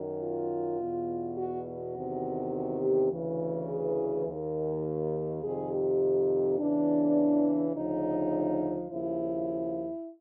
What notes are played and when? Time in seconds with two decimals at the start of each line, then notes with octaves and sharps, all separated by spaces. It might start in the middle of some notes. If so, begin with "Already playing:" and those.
Already playing: F#2 D#3
0.21 F4
0.80 E2 B2
1.38 F#4
1.66 F#4
1.96 E2 C3 D#3
2.54 F#4
2.83 G4
3.11 D2 C#3 E3
3.69 G#4
4.27 D#2 D#3
5.42 F2 C3 D#3 G#4
5.71 G4
6.58 E2 C#3 E3 D4
7.74 D2 C#3 F3 D#4
8.90 D#2 C#3 F3 E4